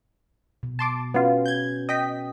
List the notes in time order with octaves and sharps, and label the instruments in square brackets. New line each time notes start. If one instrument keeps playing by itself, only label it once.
[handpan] B2
[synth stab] A5 C6 D6
[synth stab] B3 F4 [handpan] C#4 F#4 B4
[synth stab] G6 G#6
D#5 G5 B6